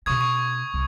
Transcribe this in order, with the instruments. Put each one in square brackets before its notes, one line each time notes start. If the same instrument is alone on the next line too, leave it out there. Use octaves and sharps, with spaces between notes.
[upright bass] B2 C#4 [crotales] C#6 D#6 G#6
[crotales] C#6
[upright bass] C2